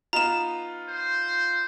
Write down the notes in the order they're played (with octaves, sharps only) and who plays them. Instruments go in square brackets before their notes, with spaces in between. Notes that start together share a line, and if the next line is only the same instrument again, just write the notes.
[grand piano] B3 D#4 F4 [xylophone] A#5 E7
[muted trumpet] C5